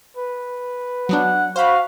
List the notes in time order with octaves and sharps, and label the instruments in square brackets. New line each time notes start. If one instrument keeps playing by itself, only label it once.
[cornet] B4
[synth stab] F#3 B3 D4 [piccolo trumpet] F#5
[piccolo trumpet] F#4 [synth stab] C5 B5 [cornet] F5